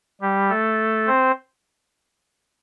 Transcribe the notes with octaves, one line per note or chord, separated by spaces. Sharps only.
G3 G4
A3 A4
C4 C5